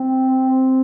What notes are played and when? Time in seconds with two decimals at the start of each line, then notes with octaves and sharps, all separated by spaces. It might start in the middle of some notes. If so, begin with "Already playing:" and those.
Already playing: C4